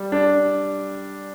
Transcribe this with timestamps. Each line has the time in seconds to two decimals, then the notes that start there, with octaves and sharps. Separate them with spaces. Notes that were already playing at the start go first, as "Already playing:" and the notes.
Already playing: G3
0.12 D4